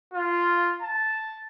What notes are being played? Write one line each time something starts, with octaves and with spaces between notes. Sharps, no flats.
F4
A5